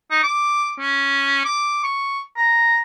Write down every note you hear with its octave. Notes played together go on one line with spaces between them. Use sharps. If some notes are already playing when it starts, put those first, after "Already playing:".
D#4
D6
C#4
D6
C#6
A#5